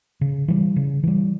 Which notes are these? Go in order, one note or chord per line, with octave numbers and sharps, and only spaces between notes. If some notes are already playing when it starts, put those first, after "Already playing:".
C#3
E3 G3
C#3
E3 G3